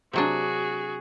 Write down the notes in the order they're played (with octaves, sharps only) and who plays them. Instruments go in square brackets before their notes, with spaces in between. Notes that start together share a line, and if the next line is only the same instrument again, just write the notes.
[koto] C3 F#3 D4 [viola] F#4 G#4